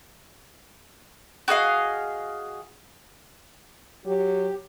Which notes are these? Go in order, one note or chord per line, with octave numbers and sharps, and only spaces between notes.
F#4 G#4 D#5 F5
F#3 G4